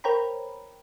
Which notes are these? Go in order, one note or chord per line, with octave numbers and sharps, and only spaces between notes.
A#4 C5 C#5 G5 A#5 B5